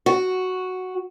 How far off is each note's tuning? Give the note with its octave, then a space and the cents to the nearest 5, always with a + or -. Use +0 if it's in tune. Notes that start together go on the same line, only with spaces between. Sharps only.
F#4 +0